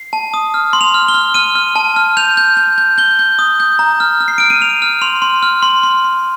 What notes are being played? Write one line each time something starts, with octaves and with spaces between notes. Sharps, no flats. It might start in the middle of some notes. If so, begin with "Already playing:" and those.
Already playing: C7
A5
D#6
F6
C6
F7
F6
G7
F6
F6 D#7
F6
A5
F6
G6 F7
G6
G6
G6
G6 G7
G6
D#6
G6
A#5
F6
F6
C7
F6 D7
D#7
F6 F7
F6
C6 F7
C6
F6
C6
C6
C6